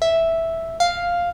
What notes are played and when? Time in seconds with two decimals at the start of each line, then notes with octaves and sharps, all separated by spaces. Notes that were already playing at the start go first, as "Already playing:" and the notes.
0.02 E5
0.80 F5